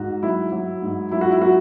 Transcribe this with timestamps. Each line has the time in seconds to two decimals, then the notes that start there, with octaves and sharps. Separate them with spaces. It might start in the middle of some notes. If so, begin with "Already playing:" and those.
Already playing: G#2 F#4
0.23 F#3 E4
0.52 F#3
0.82 G#2
1.12 F#3 E4
1.21 F#4
1.31 E4
1.41 F#3 F#4